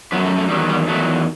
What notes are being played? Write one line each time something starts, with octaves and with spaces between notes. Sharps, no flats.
F#2 F#3 B3
A3
A3
E2 D#3 F#3 G3
G3
E2 D#3 F#3 A3